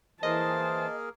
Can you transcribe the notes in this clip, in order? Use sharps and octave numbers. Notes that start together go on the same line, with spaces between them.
E3 A#3 G#4 A#4 C5 D#5 A5